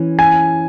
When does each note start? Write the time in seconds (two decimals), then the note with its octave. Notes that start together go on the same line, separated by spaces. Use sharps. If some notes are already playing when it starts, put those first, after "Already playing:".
Already playing: E3 C#4
0.19 G#5